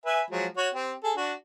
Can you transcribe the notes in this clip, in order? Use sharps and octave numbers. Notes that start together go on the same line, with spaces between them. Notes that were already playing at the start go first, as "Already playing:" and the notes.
B4 E5 G#5
F3 F#3 G#3
F#4 C#5
C4 G4
G#4 A4
D4 F#4